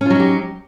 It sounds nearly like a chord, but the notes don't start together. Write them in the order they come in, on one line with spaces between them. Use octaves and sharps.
C#4 F4 F#3 D#4 G4